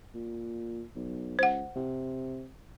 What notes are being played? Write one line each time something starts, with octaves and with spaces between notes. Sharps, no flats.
A#2
B1
C#2 C5 F#5
C3